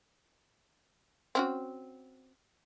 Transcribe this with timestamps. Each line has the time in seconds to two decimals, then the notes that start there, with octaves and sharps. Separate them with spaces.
1.35 C4 C#4 F#4